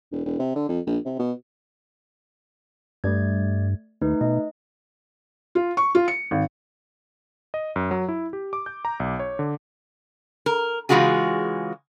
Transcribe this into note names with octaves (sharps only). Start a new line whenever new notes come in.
E1
E1
C3
D3
F2
A#1
C3
B2
G2 A3 D5 G#6
D#2 A3 D#4 B4
B2 D#5
F4
C#6
F4
C#7
G#1
D#5
F#2
F#3
E4
G4
D6
G6
A#5
B1
C#5
D3
A#4
C#3 E3 G#3 F4 F#4 G#4